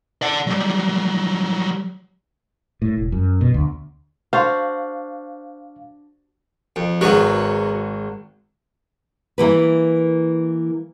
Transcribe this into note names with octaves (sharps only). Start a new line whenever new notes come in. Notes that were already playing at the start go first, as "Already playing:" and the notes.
D5 F#5
F#3 G3
A2
E1
F#2
B2
D2
D4 F#4 C5 F5
F2
G#1 F#3 G#3 B3 F#4
E3 A#3 B4